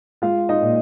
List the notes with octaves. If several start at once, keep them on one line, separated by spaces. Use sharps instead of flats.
G#3 F4 F5
D#4 D#5
A#2